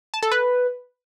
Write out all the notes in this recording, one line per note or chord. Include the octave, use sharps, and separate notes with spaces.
A5
A4
B4